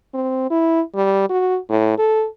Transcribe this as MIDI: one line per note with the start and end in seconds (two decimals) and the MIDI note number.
0.14 0.49 60
0.50 0.81 64
0.95 1.28 55
1.29 1.57 66
1.69 1.96 45
1.98 2.26 69